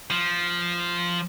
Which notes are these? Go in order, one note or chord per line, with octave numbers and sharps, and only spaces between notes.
F3